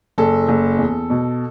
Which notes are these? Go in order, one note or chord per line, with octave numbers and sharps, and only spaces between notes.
F#1 A4
F#1
E2
B2